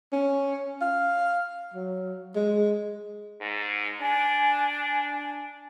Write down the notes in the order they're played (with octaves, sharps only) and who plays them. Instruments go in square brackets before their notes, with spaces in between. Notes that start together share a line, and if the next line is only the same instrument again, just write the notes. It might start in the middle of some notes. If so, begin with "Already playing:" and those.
[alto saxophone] C#4
F5
F#3
G#3
[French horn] G#2
[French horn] D4 [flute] G#5